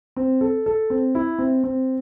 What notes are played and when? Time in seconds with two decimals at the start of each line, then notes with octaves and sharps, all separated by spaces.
0.16 C4
0.41 A4
0.66 A4
0.90 C4
1.15 E4
1.39 C4
1.64 C4